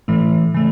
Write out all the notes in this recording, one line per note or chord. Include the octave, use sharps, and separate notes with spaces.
A2 E3 A3
C#3 E3 A3